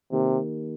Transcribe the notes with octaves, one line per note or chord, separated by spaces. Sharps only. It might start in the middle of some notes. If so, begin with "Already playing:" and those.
C3 D#3 A#3 D#4 G4 A#4